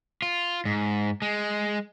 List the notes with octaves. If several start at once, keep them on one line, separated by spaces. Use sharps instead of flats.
F4
G#2
G#3